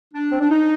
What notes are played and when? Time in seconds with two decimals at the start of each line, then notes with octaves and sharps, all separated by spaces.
0.14 D4
0.31 C4
0.41 D4
0.50 D#4